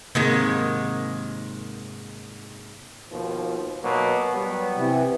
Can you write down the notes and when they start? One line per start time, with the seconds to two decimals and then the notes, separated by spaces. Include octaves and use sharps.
0.15 G#2 C3 D#3 G#3 A#3
3.09 D#2 B2 F3
3.82 B2 F#3 A#3
4.32 F#3 G3 B3
4.76 C3 E3